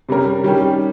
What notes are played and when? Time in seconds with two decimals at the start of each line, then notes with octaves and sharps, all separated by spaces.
0.09 C3 G3 C#4 G4 A#4
0.43 D#3 G3 C#4 G4